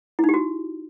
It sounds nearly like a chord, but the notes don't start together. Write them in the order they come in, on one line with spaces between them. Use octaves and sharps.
E4 D#4 G4 F#4